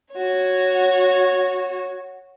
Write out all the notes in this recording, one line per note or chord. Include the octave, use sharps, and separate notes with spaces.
F#4 C#5